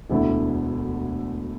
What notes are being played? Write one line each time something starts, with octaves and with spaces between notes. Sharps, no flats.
E1 D2 D3 A3 E4